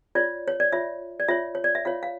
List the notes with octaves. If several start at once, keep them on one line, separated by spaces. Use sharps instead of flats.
F4 C#5 D5
C#5
D5
F4 C#5 E5
D5
F4 C#5 E5
C#5
D5
E5
F4 C#5 F5
F5